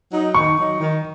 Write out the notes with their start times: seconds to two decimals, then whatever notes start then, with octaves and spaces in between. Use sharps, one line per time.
0.12 F#3 D#4
0.34 D#3 C#6
0.58 F#3 D#4
0.80 D#3